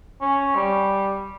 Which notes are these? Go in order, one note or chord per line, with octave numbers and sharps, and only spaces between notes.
C#4
G3